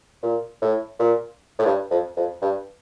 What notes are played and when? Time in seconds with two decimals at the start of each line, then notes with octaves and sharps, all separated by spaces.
0.23 A#2
0.62 A2
0.99 A#2
1.59 A2
1.65 G2
1.91 F2
2.17 F2
2.42 G2